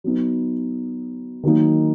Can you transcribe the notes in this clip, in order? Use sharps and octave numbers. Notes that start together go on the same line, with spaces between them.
F#3 B3 D#4
D#3 F#3 A#3 D#4